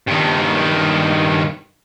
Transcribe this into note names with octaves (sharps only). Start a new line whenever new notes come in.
G2 D#3